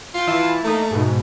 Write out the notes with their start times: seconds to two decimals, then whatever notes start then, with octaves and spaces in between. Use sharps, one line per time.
0.14 F4 G5 C6
0.27 E3 E4 A5
0.64 A3 A#3 D#4
0.91 G#2 B2